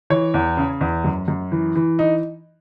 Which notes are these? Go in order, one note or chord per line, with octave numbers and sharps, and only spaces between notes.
E3 C#5
E2
C#3
E2
F#2
F#2
E3
E3
D#4